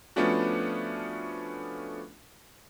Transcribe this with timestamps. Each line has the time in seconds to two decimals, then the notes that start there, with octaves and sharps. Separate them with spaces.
0.16 F3 A3 B3 C#4 D4 F#4